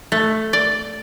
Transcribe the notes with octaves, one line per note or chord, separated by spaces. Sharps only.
A3
D5